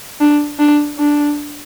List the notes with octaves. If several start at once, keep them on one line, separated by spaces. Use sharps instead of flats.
D4
D4
D4